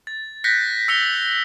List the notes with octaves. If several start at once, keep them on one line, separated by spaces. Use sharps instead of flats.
A6
F#6 G6 A#6 B6 C#7
E6 C#7 F7 G7